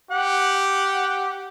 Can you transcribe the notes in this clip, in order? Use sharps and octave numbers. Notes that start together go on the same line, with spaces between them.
G4 F#5